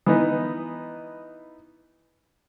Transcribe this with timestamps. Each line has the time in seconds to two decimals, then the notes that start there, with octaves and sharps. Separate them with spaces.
0.06 E3 B3 D#4